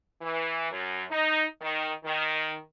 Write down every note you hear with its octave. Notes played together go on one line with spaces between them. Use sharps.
E3
F#2
D#4
D#3
D#3